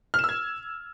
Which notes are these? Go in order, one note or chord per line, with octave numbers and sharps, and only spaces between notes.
E6 F6 G#6 E7